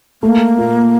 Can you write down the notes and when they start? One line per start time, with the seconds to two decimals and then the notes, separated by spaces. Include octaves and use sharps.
0.23 A3 A#3
0.58 A#2